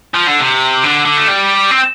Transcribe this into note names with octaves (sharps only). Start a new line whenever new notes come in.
F3
D3
C3
D3
D3
A3
G3
C4